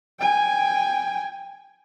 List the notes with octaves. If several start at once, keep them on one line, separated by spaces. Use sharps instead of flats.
G5 G#5